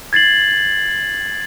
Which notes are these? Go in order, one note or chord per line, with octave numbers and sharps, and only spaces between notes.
G#6 A6 C7 F#7